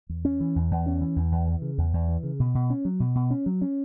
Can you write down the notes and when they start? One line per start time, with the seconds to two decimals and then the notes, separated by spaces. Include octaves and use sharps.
0.09 E2
0.25 C#4
0.40 E3
0.56 E2
0.71 E2
0.86 C#4
1.01 E3
1.16 E2
1.32 E2
1.47 E3
1.62 C#3
1.78 E2
1.93 E2
2.08 E3
2.23 C#3
2.40 B2
2.55 B2
2.70 C#4
2.85 F#3
3.00 B2
3.15 B2
3.31 C#4
3.46 F#3
3.62 C#4